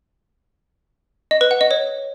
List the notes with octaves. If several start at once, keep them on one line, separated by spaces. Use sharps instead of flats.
D#5
B4
F#5
D#5
C#5